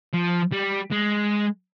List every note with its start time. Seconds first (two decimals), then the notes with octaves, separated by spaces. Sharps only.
0.13 F3
0.52 G3
0.91 G#3